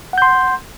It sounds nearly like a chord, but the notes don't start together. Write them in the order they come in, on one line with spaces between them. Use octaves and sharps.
F#5 G6 C6